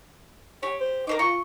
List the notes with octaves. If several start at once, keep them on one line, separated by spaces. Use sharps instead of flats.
G4 C#5
C5
D#4 A#4 C5 D6
F4 C#6